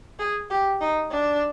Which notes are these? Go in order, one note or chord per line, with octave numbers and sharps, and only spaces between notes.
G#4
G4
D#4
D4